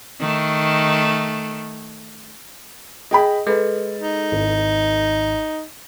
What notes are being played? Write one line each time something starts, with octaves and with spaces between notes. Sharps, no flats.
D#3 A3
G#4 D#5 G5 B5
G#3 A4 B4
D#4
G#1